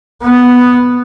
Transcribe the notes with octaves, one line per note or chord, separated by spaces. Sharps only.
B3